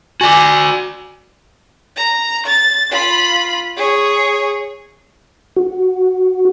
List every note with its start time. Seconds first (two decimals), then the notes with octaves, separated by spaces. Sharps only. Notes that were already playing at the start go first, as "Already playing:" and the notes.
0.21 F#4 D5 G#5 D6
1.96 A#5
2.46 A6
2.91 F4 B5
3.77 G#4 C#5
5.57 F#4